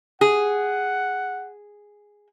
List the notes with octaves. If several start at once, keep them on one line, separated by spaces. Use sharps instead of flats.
G#4 F#5